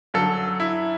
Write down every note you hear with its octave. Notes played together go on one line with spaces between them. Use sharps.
F#2 D3 F#3 A4
E4